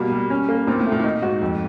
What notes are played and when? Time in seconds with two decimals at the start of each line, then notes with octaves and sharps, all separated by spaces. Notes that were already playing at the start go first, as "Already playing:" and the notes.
Already playing: B2 G3 A#3
0.12 G3
0.30 C#4
0.49 A#3
0.67 A#2 C4
0.79 A2
0.86 A3
0.92 A#2
0.99 A2
1.04 A#2 D#4
1.22 G#2 F#4
1.41 F2